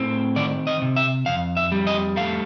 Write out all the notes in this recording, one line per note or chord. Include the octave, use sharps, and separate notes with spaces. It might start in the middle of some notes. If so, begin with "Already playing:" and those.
Already playing: A2 C4
D#3 D5
D#5
C3
E5
F2 F5
E5
G3
D#5
A3 F5